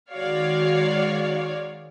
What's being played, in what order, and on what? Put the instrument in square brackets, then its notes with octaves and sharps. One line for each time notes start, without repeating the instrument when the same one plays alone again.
[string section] D#3 G#3 F#4 C#5 D5 F5